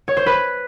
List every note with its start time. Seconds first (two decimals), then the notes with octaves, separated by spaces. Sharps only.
0.08 C#5
0.17 C5
0.26 B4